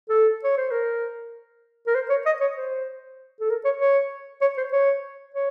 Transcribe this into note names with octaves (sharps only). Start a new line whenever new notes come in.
A4
C#5
C5
A#4
A#4
C5
C#5
D#5
C#5
C5
A4
A#4
C#5
C#5
C#5
C5
C#5
C#5